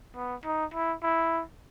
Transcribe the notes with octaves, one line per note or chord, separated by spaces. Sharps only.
B3
D#4
E4
E4